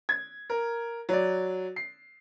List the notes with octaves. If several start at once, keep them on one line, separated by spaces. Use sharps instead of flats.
G#6
A#4
F#3 D5
C7